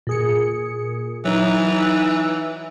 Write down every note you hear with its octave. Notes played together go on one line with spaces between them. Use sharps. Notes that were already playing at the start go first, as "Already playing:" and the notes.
A#2 G#4 C#7
E3 F#3 D#4